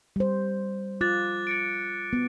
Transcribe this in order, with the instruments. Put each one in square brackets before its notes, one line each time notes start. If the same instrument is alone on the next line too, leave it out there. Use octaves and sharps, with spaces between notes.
[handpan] G3 C5
[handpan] F4 [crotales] D6 F#6 A6
[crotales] A6 C#7 D7
[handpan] B3